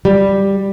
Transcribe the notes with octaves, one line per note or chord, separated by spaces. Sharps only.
G3